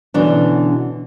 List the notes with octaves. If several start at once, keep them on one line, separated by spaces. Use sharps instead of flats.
B2 D3 E3 C#4 D4